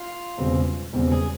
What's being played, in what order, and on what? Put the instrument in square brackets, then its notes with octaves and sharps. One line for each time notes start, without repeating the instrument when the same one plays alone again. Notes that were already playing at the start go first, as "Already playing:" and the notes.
Already playing: [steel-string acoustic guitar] F4
[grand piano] E1 E2 C#3 G3 C4
E1 E2 C#3 G3 C4
[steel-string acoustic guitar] G#4